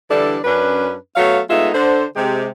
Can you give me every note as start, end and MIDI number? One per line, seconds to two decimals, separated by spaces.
0.10 0.37 50
0.10 0.37 52
0.10 0.37 55
0.10 0.37 62
0.10 0.37 64
0.10 0.37 69
0.44 0.95 42
0.44 0.95 61
0.44 0.95 62
0.44 0.95 71
1.16 1.39 54
1.16 1.39 57
1.16 1.39 59
1.16 1.39 73
1.16 1.39 77
1.50 1.69 56
1.50 1.69 57
1.50 1.69 59
1.50 1.69 63
1.50 1.69 65
1.50 1.69 76
1.74 2.04 50
1.74 2.04 72
2.16 2.46 48
2.16 2.46 56
2.16 2.46 67